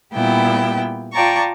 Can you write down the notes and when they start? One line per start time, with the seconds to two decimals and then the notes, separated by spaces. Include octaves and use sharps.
0.13 A#2 G3 B3 E4 G5
1.13 F4 D5 G5 A5 A#5 C#6